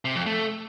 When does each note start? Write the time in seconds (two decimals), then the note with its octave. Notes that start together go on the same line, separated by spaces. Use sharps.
0.05 C3
0.15 F2
0.26 A3